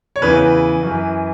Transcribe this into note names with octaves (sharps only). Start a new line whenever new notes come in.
C#5
E2 C#3 E3 B4
F#2 E3